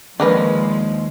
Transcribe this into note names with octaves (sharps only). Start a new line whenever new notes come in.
D#2 F3 G#3 D4 A#4 B4